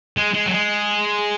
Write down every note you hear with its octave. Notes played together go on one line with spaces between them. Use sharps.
G#3
G#3
F#3
G#3